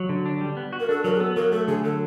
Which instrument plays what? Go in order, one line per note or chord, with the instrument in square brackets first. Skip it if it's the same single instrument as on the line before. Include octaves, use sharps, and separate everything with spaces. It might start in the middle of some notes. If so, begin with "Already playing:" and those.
Already playing: [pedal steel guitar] F#3
D3
D4
G3
B3
F#4
[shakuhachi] A#4
[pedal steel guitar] D4 [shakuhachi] A4
[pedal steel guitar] F#3 [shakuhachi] A#4
[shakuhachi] G#4
[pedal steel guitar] B3 [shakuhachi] A4
[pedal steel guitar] F#3 [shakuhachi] A#4
[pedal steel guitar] A3 [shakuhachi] A4
[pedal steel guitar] D3 [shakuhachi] G#4
[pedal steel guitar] F#3 [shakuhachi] A4